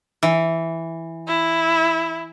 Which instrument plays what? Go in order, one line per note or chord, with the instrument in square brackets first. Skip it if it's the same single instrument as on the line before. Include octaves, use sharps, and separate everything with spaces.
[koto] E3
[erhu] E4